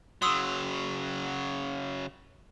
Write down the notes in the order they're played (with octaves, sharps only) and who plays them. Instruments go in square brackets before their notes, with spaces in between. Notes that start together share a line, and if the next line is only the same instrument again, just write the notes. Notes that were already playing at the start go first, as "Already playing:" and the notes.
[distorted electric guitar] C#3 F#3 [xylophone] C6 D#6 E6